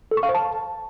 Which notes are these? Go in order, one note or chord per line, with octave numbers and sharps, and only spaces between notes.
A4
C#6
F5
C5
A5